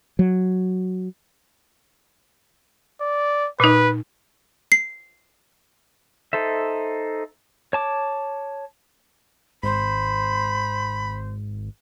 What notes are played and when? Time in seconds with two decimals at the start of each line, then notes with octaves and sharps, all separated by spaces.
0.19 F#3
3.01 D5
3.60 A#2 D#4 B4
4.72 C7
6.33 D#4 A4 C5 E5
7.73 C#5 A5 D6
9.63 G#1 C5 B5